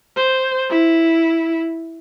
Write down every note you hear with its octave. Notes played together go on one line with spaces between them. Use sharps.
C5
E4